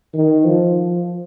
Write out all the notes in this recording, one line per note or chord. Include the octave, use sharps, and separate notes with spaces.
D#3
F3